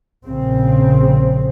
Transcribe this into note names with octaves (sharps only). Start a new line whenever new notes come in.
A#1 C#3 C4